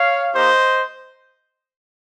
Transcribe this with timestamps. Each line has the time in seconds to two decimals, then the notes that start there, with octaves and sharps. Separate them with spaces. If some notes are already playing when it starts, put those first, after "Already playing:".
Already playing: C#5 F5
0.34 A#3 D#4 G4 C5 D#5